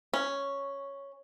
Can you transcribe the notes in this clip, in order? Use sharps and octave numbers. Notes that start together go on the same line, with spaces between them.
C#4